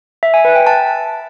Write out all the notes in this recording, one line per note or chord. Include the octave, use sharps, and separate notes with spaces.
E5
G#5
B4
G5
A5